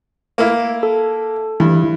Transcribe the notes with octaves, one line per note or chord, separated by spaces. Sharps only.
A#3 E4
A4
G2 E3 E4